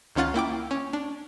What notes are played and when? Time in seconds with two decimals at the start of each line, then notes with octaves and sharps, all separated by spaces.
0.15 C#2 D#3 C#4 F4 F#5 A6
0.34 A#3 E4 G5 D6
0.71 C#4
0.93 D4